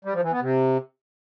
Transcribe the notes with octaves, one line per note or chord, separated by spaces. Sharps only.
G3
F3
E3
B3
C3